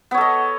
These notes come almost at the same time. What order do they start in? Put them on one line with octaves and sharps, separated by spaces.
B3 C#5 A4 D#5